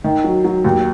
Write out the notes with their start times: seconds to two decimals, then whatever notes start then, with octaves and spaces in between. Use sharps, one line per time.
0.04 D#3
0.24 F#3
0.44 F#3
0.65 D#2